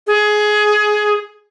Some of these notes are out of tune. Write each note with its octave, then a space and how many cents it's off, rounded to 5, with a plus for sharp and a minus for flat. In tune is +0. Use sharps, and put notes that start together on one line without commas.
G#4 +15